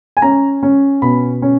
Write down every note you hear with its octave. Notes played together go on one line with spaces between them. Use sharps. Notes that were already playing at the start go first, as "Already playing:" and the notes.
G#5
C#4 A#5
C#4
B2 B5
C#4